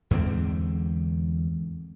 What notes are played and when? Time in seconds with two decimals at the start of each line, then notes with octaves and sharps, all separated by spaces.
0.11 E2 G#2 D3 C4